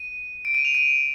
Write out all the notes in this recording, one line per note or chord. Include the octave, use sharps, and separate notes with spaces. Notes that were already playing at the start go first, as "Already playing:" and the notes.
Already playing: D#7
D7
D#7
F7
D#7